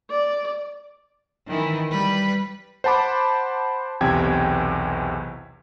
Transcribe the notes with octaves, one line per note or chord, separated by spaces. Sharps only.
D5
D#3 E3
G3 B4
C5 F#5 A5 B5 D6
B1 E2 C3 G5 G#6